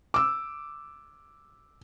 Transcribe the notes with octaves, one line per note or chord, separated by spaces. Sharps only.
D6 E6